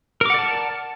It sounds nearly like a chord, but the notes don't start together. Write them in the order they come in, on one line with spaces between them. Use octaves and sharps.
A#4 D6 F#5 D5 A5